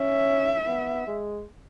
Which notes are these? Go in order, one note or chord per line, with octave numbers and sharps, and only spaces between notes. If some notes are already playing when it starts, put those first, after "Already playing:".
Already playing: C#4 E5
B3
G#3